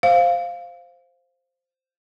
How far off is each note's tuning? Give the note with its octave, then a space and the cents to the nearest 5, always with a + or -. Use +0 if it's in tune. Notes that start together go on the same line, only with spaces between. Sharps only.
C5 +0 F5 +0